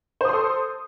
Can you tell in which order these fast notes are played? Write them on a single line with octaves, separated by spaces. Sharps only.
C5 D#6 C6 A4